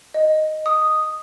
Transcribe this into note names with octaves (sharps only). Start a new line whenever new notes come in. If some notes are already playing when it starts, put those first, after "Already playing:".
D#5
D#6